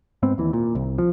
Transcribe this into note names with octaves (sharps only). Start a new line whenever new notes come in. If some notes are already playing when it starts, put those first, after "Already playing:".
G#2 B3 C4
D#2 E3
A#2
C2
F3